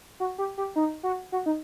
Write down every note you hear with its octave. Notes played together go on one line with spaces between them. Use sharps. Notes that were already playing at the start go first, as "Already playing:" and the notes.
F#4
G4
G4
D#4
F#4
F#4
D#4